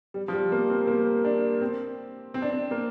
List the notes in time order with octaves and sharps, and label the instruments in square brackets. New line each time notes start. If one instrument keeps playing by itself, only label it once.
[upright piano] G3
F3
G3
A#3
C4
A#3
D4
C4
C4
D4
C4
A#3